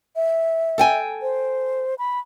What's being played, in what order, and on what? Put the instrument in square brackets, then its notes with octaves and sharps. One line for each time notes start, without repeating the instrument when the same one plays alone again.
[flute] E5
[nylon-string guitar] A4 G5 G#5
[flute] C5
B5